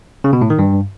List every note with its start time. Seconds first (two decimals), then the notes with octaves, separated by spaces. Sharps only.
0.24 C#3
0.33 B2
0.42 A2
0.50 D#3
0.59 G2